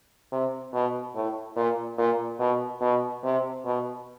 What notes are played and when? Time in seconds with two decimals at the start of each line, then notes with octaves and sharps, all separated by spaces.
0.32 C3
0.74 B2
1.15 A2
1.57 A#2
1.98 A#2
2.39 B2
2.81 B2
3.24 C3
3.65 B2